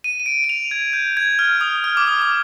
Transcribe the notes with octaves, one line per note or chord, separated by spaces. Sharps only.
D#7
D#7
D7
D#7
F7
G#6
G6
G#6
F6
D#6
F6
D6
D#6
D6